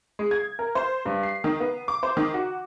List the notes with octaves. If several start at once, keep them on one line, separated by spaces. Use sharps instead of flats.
G#3
G#6
A#4
C5
G2
C7
D#3
B3
D6
C5
D#3
F#4